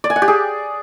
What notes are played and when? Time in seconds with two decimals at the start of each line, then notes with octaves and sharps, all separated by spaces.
0.04 D5
0.10 G#5
0.16 F#5
0.22 G4
0.28 G#4